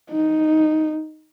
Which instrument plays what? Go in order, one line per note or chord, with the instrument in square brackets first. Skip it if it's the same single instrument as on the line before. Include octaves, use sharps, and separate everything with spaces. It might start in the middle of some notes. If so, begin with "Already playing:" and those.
[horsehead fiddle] D#4